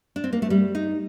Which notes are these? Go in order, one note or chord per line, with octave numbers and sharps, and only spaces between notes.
D4
C4
A#3
A3
G3
D#4